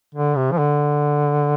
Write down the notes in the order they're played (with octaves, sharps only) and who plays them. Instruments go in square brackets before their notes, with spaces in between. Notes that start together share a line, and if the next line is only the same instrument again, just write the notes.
[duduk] D3
C3
F3
D3